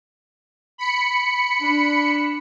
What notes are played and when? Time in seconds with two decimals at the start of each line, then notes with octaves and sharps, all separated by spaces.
0.78 B5 C#7
1.61 D4